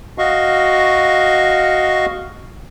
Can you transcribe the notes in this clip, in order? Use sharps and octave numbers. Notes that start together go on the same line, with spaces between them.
F#4 D#5 F5 C#6